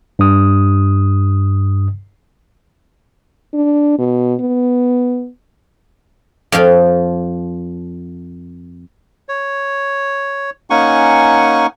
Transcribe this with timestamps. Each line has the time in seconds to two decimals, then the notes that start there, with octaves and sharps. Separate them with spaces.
0.19 G2 D#6
3.54 D4
3.98 B2
4.41 B3
6.52 F2 F3 F5 G5
9.29 C#5
10.70 A#3 C#4 D#4 F#5 G#5 C#6